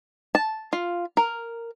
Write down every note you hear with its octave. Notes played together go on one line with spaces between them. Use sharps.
A5
F4
A#4